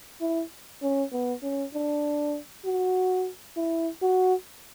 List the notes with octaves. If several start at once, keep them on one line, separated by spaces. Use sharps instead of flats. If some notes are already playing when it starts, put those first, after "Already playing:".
E4
C#4
B3
C#4
D4
F#4
E4
F#4